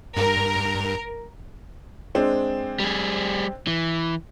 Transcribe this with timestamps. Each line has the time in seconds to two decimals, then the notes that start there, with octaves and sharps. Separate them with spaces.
0.17 G2 A#4
2.15 G#3 C4 D4
2.80 G3 G#4
3.67 E3